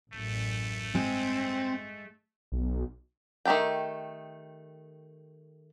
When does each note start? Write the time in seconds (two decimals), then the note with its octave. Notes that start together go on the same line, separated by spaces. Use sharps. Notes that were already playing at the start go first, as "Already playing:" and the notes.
0.13 A1 F#2 A3
0.95 G2 G#3 C4
2.52 B1
3.45 D#3 A3 G4 A4 G5